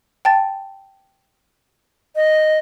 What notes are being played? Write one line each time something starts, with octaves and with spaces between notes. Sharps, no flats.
G5 A5 A6
D#5